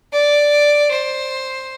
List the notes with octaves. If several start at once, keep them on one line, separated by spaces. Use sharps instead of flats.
D5
C5